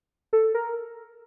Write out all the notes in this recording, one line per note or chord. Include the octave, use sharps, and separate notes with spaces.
A4
A#4